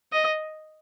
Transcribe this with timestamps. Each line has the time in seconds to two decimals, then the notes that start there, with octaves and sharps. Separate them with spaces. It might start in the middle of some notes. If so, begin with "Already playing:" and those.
0.12 D#5